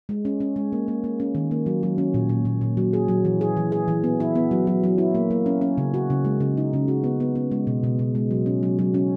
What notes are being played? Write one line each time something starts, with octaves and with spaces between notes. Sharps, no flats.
G#3
C#4
C#4
G#3
A#3
A#3
A#3
C#4
D#3
A#3
F#3
F#3
C#4
A#2
A#2
A#2
A#2
F#3
G#4
F#3
E3
G#4
E3
G#4
E3
B3
E4
B3
F#3
F#3
F#3
E4
A#3
A#3
C#4
C#4
C#3
F#4
C#3
G#3
C#3
D#4
C#3
F#4
B3
B3
B3
G#3
B2
B2
B2
G#3
F#3
C#4
F#3
F#3
C#4